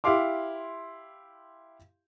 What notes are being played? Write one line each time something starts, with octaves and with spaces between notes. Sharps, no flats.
E4 G4 F5 C6 D6